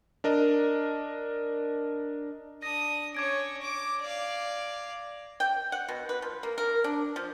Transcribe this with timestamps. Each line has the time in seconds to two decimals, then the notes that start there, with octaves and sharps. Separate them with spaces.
0.24 D4 A#4 D#5
2.62 D4 D#6 A#6
3.15 C#4 C#5 D6 G#6 D7
3.62 D6 D7
4.01 D5 F5
5.40 G5
5.72 F#5
5.89 B2
6.09 B4
6.22 F3
6.43 A#3
6.58 A#4
6.84 D4
7.16 F3